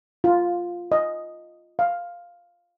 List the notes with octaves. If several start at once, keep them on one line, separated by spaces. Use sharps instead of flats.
F4
D#5
F5